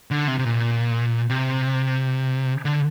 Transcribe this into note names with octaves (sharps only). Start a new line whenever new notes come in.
D3
C3
C3
A#2
C3
D3